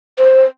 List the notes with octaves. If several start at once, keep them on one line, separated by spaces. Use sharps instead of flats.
C5